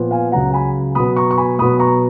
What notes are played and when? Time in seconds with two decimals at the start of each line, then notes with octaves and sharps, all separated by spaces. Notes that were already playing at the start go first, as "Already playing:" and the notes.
Already playing: A#2 F3 B3
0.11 F5 G#5
0.32 C#2 C#3 F#3 F#5 A#5
0.53 G#5 B5
0.95 B2 F#3 B3 B5 D#6
1.17 A#5 C#6
1.31 C#6
1.37 G#5 B5
1.59 B2 F#3 B3 B5 D#6
1.79 A#5 C#6